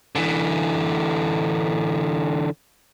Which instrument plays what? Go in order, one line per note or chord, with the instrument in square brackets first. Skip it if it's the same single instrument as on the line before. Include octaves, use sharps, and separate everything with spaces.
[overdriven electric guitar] D3 E3